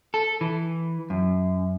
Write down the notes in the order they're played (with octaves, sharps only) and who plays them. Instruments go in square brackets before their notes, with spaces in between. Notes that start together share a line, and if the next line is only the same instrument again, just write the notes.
[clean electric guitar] A4
E3
F#2